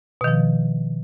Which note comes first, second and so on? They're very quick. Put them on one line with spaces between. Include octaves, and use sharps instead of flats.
B2 D#3 F3